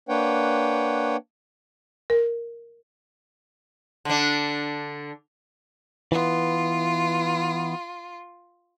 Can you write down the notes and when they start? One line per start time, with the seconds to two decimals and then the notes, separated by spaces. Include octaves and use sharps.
0.09 A#3 D4 B4 C#5 F#5 G5
2.10 A#4
4.05 D3 D4
6.12 E3 B3 F4